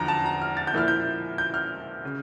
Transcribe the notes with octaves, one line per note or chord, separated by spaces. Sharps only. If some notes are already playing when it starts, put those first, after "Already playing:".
Already playing: E2 D3 F3 A#5
A5
A#5
F6
A6
G6
A#2 F3 A#3 E4 F6
G6
G6
F6
C#3